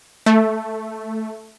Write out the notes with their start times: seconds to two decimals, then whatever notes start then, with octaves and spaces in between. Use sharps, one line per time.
0.26 A3